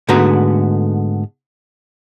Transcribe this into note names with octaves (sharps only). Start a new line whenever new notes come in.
G#2 D3 A3 B3 F#4 A#5